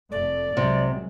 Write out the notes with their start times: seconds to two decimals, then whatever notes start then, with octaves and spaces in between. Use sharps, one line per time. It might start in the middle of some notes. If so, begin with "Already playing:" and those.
0.11 F1 A3 D5
0.57 C2 C3 F#3 G#3